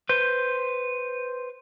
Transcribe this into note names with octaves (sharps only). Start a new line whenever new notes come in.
B4 C5